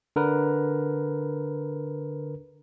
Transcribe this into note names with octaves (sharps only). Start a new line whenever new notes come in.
D3 A#4 B4